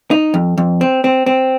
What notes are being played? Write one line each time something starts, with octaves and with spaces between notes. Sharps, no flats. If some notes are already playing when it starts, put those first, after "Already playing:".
D#4
F2
F2
C4
C4
C4